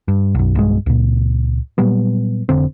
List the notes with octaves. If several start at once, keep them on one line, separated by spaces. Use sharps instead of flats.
G2
B1 F#2
B1 G2 G#3
C#2 A#2
A#2 F#3 G3 B3
F1 D3 C4